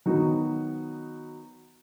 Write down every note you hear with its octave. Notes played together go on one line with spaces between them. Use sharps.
D#3 F#3 B3 D#4 F#4